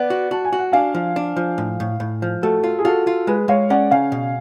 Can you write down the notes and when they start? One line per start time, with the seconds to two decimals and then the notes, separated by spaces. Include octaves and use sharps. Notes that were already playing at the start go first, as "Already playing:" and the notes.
Already playing: B3 D5 F#5
0.10 F#4
0.31 F#4 A5
0.45 G#5
0.53 F#4
0.59 F#5
0.72 D4 F5 G#5
0.95 F3
1.16 D4
1.36 F3
1.58 A2
1.80 A2
2.00 A2
2.22 F3
2.42 A3 F#4 A4
2.64 F4
2.79 G#4
2.85 F4 F#4 A4
3.07 F4
3.27 G#3 G#4 B4
3.48 G#3 C#5 F5
3.70 C#4 D5 F#5
3.91 C#3 F5 G#5
4.12 B2